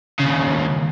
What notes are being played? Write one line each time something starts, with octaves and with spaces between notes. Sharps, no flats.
D#2 C#3